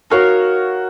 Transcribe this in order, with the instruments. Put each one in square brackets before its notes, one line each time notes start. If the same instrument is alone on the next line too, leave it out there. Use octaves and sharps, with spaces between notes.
[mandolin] D#4 A#4 C#5 F5 [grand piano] F#4